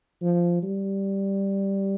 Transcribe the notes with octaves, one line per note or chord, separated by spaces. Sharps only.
F3
G3